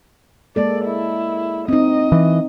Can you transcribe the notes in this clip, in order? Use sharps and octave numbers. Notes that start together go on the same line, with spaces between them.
G#3 A#3 A4 D5
E4
C4 D#4 D#5
E3